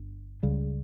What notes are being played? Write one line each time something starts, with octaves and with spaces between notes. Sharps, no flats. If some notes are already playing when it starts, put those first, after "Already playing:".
Already playing: G1 G2
C#2 C#3 G3